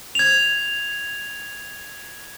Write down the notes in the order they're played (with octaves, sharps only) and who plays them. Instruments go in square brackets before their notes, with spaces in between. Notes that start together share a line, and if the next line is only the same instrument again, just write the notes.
[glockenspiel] G#6 F7